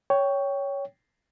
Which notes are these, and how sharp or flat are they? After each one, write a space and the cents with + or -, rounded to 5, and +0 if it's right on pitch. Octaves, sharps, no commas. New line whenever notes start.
C#5 +10 G5 +0